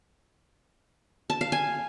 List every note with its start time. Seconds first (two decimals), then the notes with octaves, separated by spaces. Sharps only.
1.30 A5
1.41 F5
1.52 G#5